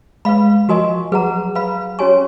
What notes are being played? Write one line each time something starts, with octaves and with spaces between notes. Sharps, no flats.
G#3 B4 F5 B5
F3 F#4 A#4 D#5 G#5 C#6
F#3 G#4 B4 F#5 A#5
B4 F5 B5
C#4 F#4 C#5 G#5 C#6